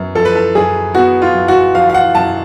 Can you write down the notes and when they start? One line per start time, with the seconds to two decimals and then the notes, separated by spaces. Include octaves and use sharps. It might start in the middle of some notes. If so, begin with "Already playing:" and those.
Already playing: F#2 B3
0.15 F3 A4
0.25 B4
0.35 A4
0.55 F#2 G#4
0.95 B3 F#4
1.22 F4
1.35 F#2
1.48 F#4
1.75 F3 F5
1.90 F5
1.94 F#5
2.15 F#2 A5